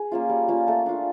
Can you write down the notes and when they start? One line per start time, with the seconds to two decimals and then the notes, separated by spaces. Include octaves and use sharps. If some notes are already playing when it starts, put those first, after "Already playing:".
Already playing: G#4
0.12 A#3 C#4 F4
0.29 G3
0.48 A#3 C#4 F4
0.67 A3 A4
0.86 D4 F4